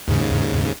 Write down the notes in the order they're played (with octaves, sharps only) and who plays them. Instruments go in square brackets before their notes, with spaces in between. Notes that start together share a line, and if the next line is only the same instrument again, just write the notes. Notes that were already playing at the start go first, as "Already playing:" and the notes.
[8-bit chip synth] D#2 G#2 C#3